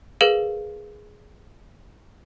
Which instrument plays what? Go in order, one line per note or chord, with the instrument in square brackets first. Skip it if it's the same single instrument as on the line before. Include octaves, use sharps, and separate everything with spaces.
[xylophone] G#4 A#4 B4 F5